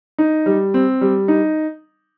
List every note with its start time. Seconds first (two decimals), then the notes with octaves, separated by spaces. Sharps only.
0.18 D#4
0.46 G3
0.74 C4
1.01 G3
1.28 D#4